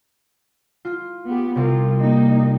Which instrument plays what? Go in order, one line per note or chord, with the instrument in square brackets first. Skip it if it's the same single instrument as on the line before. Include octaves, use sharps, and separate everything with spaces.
[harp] F4
[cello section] B3 G4
[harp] C2 C3 [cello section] F4
[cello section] A#3 D#4